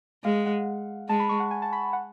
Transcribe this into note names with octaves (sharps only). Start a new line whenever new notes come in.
G#3 F5
F#5
G#3 A5
B5
C#6
F#5
G#5
A5
B5
F#5